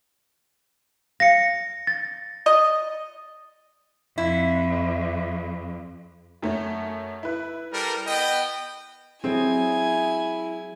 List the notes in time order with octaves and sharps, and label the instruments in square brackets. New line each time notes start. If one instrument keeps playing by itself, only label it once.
[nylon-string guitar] F5 [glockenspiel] A#6 C#7
[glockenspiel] A6
[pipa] D#5
[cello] F2 [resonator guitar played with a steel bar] E4
[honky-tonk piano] F#2 A3 C#4
E4 B4
[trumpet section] G3 A4 A#4
B3 D#5 G5
[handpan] F#3 G#4 [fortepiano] C4 [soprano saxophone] E4 [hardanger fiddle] G#5